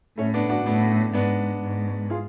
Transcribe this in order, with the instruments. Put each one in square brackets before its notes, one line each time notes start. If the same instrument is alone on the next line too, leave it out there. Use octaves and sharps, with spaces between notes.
[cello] A2 [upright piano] A3 C#4
[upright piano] B3 D4
D4 F#4
[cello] A2 [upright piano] B3 D4
[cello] G#2 [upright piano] B3 D4
[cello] G#2
[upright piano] F4 G#4